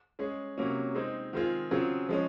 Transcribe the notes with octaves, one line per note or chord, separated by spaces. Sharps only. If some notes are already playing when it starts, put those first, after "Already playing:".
G#3 C#4 G#4
C3 F#3 A#3 C#4
G#3 C4 D#4 G#4
D#3 G#3 C4 F4 G#4
C#3 F#3 C4 F4 G#4
F3 G#3 C#4